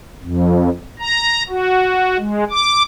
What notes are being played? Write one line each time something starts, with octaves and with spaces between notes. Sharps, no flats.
F2
A#5
F#4
G#3
D6